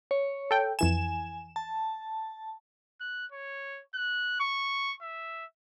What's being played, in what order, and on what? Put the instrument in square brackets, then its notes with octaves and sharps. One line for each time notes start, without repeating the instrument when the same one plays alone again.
[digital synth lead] C#5
[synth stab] A4 G5
[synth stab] F2 E3 E7 [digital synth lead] G#5
[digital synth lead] A5
[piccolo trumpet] F#6
C#5
F#6
C#6
E5